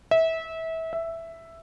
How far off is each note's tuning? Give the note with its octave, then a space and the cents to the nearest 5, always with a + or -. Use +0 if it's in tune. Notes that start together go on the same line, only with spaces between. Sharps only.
E5 -25
E5 +5